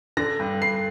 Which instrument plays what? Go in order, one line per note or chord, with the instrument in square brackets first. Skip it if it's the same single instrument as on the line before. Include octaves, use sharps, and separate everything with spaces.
[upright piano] D3 A#6
G2
G2 C7